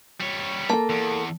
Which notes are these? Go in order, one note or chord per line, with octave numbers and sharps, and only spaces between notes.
G3 C#5
A#3 A4 A5
E2